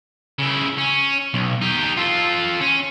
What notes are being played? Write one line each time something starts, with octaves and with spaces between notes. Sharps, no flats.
C#3 E4
C#4
B1
D#4 G4
F4 A4
C#4